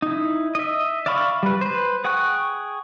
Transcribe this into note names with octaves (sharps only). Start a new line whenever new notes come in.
D#4 E4
D#5 E5
D5 E5 F5 B5 C#6
G3 B4
B4 C5
G#4 F#5 G5 C#6 F#6